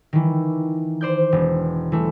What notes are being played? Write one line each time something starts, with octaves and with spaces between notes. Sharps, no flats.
D#3 E3
C5 D5 G6
E1
E3 A3